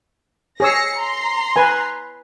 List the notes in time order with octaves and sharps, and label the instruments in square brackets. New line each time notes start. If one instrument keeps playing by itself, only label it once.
[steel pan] G#4 C#5 E6 [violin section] A#6 C7 C#7
[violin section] A#5 C6
[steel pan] B4 G#5